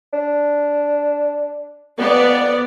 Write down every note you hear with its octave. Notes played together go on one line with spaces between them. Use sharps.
D4
F2 B3 D5